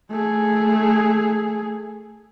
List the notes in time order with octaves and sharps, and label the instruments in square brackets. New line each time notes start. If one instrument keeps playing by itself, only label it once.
[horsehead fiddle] A3 G#4